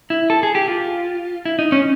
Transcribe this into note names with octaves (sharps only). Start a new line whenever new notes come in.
E4
A4
G#4
G4
F4
E4
D#4
C#4